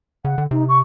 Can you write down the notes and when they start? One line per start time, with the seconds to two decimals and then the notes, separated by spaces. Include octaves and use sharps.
0.25 C#3 F#5
0.38 D3
0.51 C3 D#4
0.68 C#6